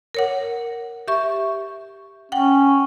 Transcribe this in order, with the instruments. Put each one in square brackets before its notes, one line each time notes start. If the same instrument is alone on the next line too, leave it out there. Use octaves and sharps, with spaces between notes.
[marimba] A#4 C#5 F#5
G4 E5 C#6
[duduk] C#4 [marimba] F#5 G5